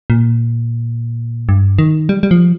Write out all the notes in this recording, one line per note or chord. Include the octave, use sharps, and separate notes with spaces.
A#2
G2
D#3
G3
G3
F3